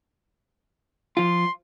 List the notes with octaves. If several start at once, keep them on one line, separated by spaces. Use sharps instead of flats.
F3 F4 C6